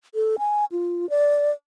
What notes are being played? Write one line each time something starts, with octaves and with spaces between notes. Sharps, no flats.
A4
G#5
F4
D5